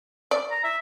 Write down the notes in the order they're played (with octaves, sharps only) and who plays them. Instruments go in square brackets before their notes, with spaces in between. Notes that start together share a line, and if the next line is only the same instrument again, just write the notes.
[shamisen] D5
[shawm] A#5
E5